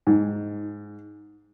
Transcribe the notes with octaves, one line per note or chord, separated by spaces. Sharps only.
G#2